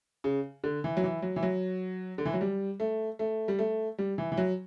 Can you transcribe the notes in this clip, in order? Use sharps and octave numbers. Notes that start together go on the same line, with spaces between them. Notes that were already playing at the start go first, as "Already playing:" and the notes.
C#3
D3
E3
F#3
E3
F#3
E3
F#3
D3
E3
F#3
G3
A3
A3
G3
A3
G3
E3
E3
F#3